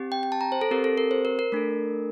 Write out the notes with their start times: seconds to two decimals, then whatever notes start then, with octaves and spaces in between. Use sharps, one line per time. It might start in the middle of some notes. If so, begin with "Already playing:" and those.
Already playing: C4 G4
0.12 G5
0.23 G5
0.32 A5
0.41 A#5
0.52 C5
0.61 A4
0.71 C4 G4 A#4
0.84 A4
0.98 A#4
1.11 C5
1.25 A#4
1.39 A#4
1.52 A3 D4 A4